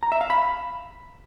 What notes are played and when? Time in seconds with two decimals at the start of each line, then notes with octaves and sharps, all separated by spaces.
0.03 A#5
0.12 E5
0.21 F5
0.30 B5